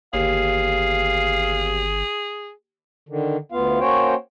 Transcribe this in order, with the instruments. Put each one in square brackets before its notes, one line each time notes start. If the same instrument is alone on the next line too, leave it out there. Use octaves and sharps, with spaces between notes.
[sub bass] G1 [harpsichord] D#2 [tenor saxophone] G#4 [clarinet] F5
[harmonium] D3 D#3
D2 B3 F4 F5
A#3 C#4 F#4 C5 C#5 G5